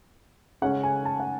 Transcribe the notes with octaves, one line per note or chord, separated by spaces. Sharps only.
C#3 G#3 C#4 F#5
G#5
A5
F#5